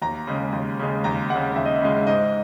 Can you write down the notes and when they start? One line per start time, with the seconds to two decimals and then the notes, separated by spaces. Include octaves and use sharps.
0.02 D#2 A#5
0.27 C#3 G#3
0.53 D#2
0.79 C#3 G#3
1.04 D#2 A#5
1.30 C#3 G#3 F#5
1.56 D#2 E5
1.65 D#5
1.74 E5
1.81 C#3 G#3
2.07 G#2 D#5